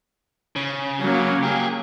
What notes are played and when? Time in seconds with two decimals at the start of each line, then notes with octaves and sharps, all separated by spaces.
0.56 C#3
1.01 F#3 A#3
1.43 G4 G#4